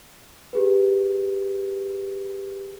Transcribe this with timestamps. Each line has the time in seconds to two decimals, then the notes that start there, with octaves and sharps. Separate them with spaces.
0.53 G4 G#4 B4